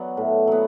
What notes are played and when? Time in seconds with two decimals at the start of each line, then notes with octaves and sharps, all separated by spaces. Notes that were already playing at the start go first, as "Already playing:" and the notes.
Already playing: F#3 B3 D5
0.17 A2
0.47 F#3 B3